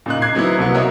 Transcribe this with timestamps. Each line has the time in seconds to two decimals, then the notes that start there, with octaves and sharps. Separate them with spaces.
0.06 A#2 C#3 D#4 F#6
0.22 D6 G#6 C7
0.34 D#3 F#3 B3 C4 E4
0.58 C2 F#3 B3
0.74 F#4 A#4 C#5 D#5 E5